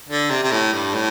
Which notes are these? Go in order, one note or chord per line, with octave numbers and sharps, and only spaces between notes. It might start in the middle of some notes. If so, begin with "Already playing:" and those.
D3
C3
C3
A2
G2
A2